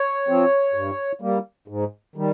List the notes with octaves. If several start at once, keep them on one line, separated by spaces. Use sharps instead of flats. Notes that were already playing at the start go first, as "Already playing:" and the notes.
Already playing: C#5
F3 C4
G2
G3 A#3
G#2
D#3 G3